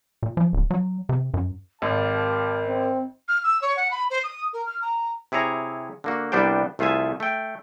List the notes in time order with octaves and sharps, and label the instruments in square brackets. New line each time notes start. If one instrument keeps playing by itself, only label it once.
[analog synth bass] A#2
F3
D1
F#3
C3
F#2
[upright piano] G#1 [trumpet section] G4 F5 A5 [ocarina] A#4
[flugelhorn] C4
[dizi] F6
E6
C#5
F#5
B5
C5
D#6
A#4
F6
A#5
[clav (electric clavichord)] C3 E4 G#4 C#5 A#5
D3 A#3 F#4
C2 G3 B3 D4 C5 G5
C2 A3 F4 G#4 E5 G#5
A3 G5